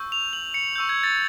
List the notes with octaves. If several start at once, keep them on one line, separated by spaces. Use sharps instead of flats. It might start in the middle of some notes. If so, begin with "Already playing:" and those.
Already playing: C#6 E6 G6
F7
F#7
C#7
C#6 E6 G6
G#6
A6